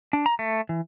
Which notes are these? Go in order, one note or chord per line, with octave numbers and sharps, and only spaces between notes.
D4
A#5
A3
E3